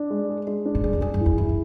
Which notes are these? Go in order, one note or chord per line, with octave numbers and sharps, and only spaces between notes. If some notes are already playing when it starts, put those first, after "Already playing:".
Already playing: D4
G#3
G#4
G#3
D4
G#2
F#2 G#4
E2
F#2 G#4
F#2
E3
E2
F#2 E4